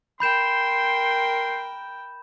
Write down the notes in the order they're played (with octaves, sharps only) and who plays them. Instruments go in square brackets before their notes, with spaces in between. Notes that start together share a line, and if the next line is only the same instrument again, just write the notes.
[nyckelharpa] A#4 G5 [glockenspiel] B5 G6 E7 [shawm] C6